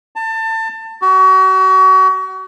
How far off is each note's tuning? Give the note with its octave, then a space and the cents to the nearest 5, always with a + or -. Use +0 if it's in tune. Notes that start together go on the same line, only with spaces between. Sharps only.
A5 +25
F#4 +35